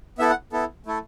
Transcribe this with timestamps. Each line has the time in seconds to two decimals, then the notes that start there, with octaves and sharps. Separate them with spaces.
0.19 B3 E4 A4 E5
0.30 F#5
0.52 B3 E4 A4
0.86 A3 E4 A4